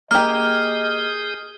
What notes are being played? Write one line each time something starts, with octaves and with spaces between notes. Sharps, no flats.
A#3 G4 G#4 D#5 D#6 F6 G6